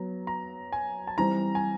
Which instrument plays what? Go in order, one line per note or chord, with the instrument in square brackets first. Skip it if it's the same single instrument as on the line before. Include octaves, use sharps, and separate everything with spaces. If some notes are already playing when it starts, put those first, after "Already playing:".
Already playing: [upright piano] F#3 B3 [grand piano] A#5
[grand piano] A#5
G#5
A5
[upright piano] E3 G3 C4 [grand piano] A#5
[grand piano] G#5